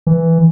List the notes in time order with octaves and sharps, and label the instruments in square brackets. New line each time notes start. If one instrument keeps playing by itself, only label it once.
[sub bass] E3